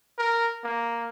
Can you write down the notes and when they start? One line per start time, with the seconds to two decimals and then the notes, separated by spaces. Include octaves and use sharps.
0.18 A#4
0.64 A#3